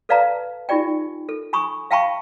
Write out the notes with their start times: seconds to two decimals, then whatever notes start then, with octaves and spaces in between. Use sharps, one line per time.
0.09 A4 B4 D5 F5 A5 A#5
0.69 D#4 F4 G4 D5 G5
1.29 A4
1.53 G#5 B5 C#6 D#6
1.91 E5 F5 G5 A5 B5 C#6